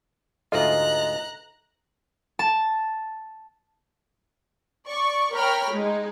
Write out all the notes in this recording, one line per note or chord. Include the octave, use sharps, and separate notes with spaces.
D2 G#2 F4 A4 D#5 E5 A#5 F#6
A5
D5 C#6
A#4 C#5 G5 A#5 B5 F6
G#3 D#4